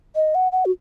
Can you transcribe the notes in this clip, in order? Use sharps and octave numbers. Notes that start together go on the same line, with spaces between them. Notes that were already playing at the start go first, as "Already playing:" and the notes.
D#5
F#5
F#5
F#4